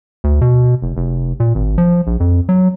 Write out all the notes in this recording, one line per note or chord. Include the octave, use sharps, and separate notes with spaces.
D2
B2
F1
F1
A#2
G#1
F3
A#1
F2
F#3